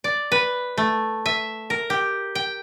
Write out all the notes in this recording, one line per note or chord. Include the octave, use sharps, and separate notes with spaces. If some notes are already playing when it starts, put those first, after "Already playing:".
D5
B4
A3
E5
A#4
G4
G5